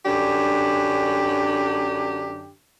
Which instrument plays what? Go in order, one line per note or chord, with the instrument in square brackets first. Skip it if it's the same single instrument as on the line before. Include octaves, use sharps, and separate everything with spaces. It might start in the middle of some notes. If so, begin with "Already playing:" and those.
[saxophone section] F#2 D3 D4 G4